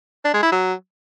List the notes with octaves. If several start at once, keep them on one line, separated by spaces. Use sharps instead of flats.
D4
G#3
E4
F#3